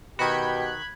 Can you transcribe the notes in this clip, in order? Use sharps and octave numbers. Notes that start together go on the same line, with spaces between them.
B2 D#3 F#4 G4 B5 F#6 G#6